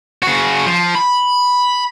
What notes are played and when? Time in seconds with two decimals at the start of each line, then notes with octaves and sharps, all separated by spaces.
0.23 C#3 F#4
0.66 F3
0.95 B5